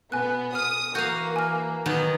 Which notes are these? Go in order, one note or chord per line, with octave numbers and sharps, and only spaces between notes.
B2 B3 G#5 F#6
D#6 F6
E3 A#3 F#4 F5 G6
G#5 F6
D#3 F#3 B3